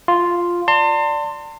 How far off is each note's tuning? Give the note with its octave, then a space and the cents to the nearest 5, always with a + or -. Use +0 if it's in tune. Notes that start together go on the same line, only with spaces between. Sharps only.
F4 +0 C6 +0
D5 -5 A5 +40 C6 +0